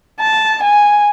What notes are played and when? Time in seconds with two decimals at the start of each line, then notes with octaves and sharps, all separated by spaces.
0.20 A5
0.63 G#5